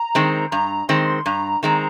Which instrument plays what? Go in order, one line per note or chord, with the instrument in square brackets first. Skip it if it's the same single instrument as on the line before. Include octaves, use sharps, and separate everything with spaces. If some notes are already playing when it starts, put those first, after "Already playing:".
Already playing: [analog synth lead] A#5
[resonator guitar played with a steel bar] D#3 G#3 C4
[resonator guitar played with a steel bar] G2 [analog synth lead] A#5
[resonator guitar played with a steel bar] D#3 G#3 C4 [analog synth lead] C6
[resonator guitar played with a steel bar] G2 [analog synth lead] A#5
[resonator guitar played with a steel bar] D#3 G#3 C4 [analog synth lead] A#5